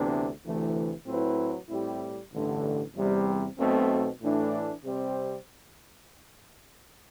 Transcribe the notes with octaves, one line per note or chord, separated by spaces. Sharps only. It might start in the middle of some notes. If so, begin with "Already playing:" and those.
Already playing: D2 C3 E3 B3 D4
D2 C3 E3 A3
A2 F#3 C4 E4 B4
A2 G3 C4 E4 G4
A1 G2 D3 A3
E2 C3 G3 C4
B1 B2 A3 C4
A2 E3 A3 D4
C3 G3 C4 G4 C5